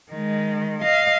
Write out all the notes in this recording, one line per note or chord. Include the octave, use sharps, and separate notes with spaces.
D#3 G#3
D#5 F5